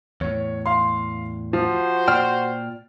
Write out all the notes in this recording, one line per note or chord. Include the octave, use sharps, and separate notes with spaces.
E2 A2 C#5
F5 C6
F3 F#4 C5
A#2 D5 G5 F6